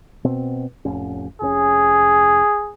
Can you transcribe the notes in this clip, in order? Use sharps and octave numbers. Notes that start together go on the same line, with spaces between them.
B2 C4
F1 A2 C#4
F1 A#2 C#4 G#4